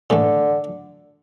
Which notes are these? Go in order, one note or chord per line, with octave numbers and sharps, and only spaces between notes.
A2 D3 E3 A3